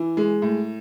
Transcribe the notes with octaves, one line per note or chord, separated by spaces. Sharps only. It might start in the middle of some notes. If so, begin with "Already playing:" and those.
Already playing: E3
G#3
A2